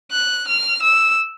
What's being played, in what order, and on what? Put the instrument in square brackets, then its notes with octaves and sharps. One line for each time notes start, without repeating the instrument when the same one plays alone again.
[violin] F#6
F6
E6